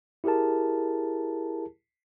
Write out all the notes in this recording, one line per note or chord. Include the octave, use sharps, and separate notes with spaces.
E4 G4 G#4 A#4 A5